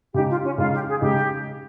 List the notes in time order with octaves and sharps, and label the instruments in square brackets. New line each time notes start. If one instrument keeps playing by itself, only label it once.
[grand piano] C#3 G#3 D#4 [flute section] G4
[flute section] F4
C#4
[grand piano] C#3 G#3 D#4 [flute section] F4
[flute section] G4
G#4
[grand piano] C#3 G#3 D#4 [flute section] G4